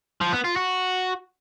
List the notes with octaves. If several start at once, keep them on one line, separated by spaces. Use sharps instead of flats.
F3
B3
F4
F#4